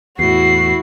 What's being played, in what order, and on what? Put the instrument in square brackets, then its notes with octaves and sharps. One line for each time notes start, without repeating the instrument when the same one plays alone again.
[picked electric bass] E2 A2 [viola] E4 F#4 [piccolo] C7